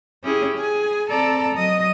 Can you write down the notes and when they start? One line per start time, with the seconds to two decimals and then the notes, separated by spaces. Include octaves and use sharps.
0.24 C#4 E4 G4 G#4
0.55 G#4 G#5
1.09 C4 A4 D5 A5 A#5
1.55 F#3 D#5 D#6